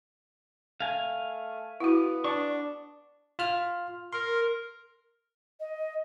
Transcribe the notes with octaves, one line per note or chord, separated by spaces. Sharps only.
A3 F5 G#5
B3 E4 F#4
D4 C#6
F4 F6
A#4 C6
D#5